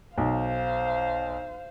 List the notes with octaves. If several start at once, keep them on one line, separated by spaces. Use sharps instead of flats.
B1 C5 F5